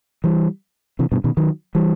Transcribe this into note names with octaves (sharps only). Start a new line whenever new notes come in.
E3 G3
C3 E3
G2 B2
B2 D#3
D#3 F#3
E3 G3